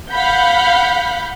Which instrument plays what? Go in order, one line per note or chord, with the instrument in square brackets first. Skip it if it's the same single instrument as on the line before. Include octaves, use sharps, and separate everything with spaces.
[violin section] F5 F#5 B5 G6